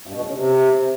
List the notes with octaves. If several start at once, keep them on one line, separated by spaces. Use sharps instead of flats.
G2
B2
E2
C#3
C3